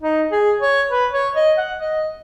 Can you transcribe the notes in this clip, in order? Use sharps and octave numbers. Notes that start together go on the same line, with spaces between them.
D#4
G#4
C#5
B4
C#5
D#5
F#5
D#5